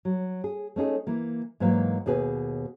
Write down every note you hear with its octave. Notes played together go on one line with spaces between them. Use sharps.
F#3
G#4
A3 C#4 D#4 G#4
E3 A#3
G#2 E3 F#3 A#3 F#4 F5
D#2 B2 G#4 B4 G#5